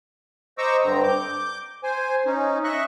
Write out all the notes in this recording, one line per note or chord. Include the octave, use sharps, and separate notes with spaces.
C5 D#5 A#5 C#6 D6 E6
G2 D3 C4 A#5
D6 G6
C5 G#5
C#4 D#4
D#5 E5 C#6 F#6